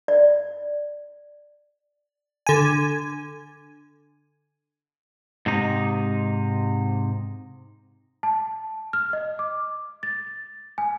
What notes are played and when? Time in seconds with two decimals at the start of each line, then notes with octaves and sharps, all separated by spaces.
0.08 D5
2.47 D3 G#5
5.46 G#2 C3 D#4
8.23 A5
8.93 F6
9.13 D#5
9.39 D6
10.03 A6
10.78 G#5